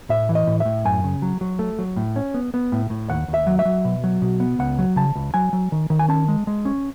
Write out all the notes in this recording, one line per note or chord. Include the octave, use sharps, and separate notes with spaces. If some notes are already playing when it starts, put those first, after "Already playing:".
A2 E5
E3
D#5
A2
E5
A2
F#2 G#5
C#3
F#3
F#3
A3
F#3
A2
C#4
B3
B3
A2
A2
D#2 F#5
D#2
E5
F#3
E5
F#3
B2
F#3
B2
B3
C#2 F#5
F#3
C#3 A5
C#2
F#3 G#5
F#3
D#3
D#3
G#5
C#4 A5
G#3
G#3
C#4